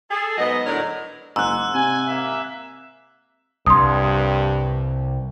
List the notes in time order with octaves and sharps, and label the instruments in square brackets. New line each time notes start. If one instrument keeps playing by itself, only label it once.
[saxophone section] G#4 A4
G#2 F#3 B3 D#5
A2 D3 F#3 A#4 C#5 D5
[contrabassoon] F#1 [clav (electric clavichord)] G#2 [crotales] E6 F#6
[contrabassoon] C3 [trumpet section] G#5
[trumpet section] A#3 E5
[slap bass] C2 [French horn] G2 [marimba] C6 D#6